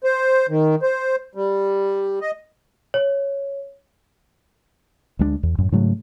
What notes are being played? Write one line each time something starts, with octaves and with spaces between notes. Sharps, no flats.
C5
D#3
C5
G3
D#5
C#5
D2 G#3 B3 D4
E2
F#2 A2
G#2 C#3 F#3 A3